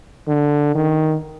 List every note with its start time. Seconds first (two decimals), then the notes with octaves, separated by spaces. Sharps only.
0.28 D3
0.75 D#3